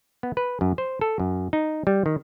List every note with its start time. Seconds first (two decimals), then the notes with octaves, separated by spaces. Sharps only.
0.23 B3
0.37 B4
0.61 F#2
0.78 C5
1.01 A4
1.19 F#2
1.53 D#4
1.87 G3
2.06 D#3